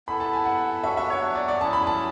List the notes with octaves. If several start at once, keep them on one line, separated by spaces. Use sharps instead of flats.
B3 E4 A4 B5
A5
G#5
F#5
F#3 B3 D4 F#4 E5
E5
C#5
D5
D5
F#3 C#4 E4 G#4 A5
B5
A5